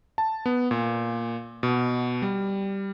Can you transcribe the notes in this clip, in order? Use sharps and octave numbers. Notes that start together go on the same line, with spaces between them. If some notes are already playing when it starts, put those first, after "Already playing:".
A5
B3
A#2
B2
G3